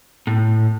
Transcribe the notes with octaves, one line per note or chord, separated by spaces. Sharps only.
A2